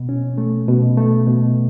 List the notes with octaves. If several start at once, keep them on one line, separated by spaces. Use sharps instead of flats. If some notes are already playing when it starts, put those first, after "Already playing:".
Already playing: B2
C#4
A3
B2
A3
B2